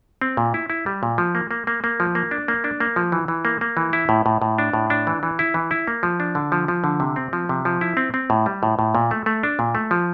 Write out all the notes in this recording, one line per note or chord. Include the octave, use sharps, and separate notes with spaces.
C4
A#2
E4
E4
G3
A#2
F3
A#3
A#3
A#3
A#3
F3
A#3
D4
A#3
D4
A#3
F3
E3
E3
A#3
A#3
E3
E4
A2
A2
A2
D4
A2
D4
E3
E3
E4
E3
E4
A#3
F3
D4
D3
F3
F3
D3
C3
C4
F3
C3
F3
E4
C4
C4
A2
G3
A2
A2
A#2
A3
A3
D4
A#2
A3
F3